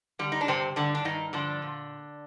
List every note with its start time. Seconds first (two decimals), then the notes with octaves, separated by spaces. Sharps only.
0.19 D3 G3
0.32 D#4
0.41 D4
0.48 G2 C3 C4
0.76 G2 D3 D4
0.95 D4
1.05 G2 D#3 D#4
1.33 D3 F3 D4
1.62 A#2